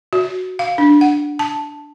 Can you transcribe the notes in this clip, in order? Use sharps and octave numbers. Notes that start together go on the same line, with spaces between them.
F#4
F5
D4
F#5
A5